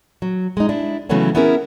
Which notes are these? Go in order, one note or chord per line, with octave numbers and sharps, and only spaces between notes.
F#3
G#3 D#4
D4 E4
C#3 E3 F#3 A3 B3 C#4
B3 C#4 E4 G#4 A#4